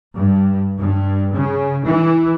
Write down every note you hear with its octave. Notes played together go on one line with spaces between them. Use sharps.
G2
G2
C#3
E3